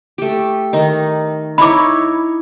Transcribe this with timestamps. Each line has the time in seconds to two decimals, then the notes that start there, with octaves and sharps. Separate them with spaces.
0.18 A3 G4
0.73 D#3 D#4
1.58 D#4 E4 C#5 B5 D6